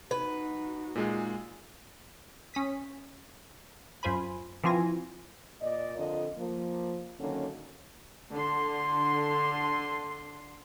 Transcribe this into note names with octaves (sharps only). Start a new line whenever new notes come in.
D#4 F#4 B4
A#2 G#3 G#4
C#4 D#6 B6
F#2 F4 C5 G#5 B5
E3 F3 C4 F4 G#5 A#6
A#2 D5 D#5
F2 D3 F4 A#4 D#5
F3 A#3
D3 D#3 F#3 A#3 C#4
D3 C6